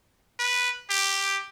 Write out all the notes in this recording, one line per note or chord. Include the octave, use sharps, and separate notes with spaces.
B4
G4